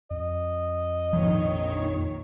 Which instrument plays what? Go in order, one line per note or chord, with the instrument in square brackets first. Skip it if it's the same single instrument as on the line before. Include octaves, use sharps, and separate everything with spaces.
[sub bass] F2 [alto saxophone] D#5
[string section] A#1 D#3 C#5 [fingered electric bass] F3